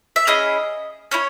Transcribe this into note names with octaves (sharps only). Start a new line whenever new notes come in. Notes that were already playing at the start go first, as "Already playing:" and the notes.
E5
C#4 E4 G#4 D#5
C#4 E4 C#5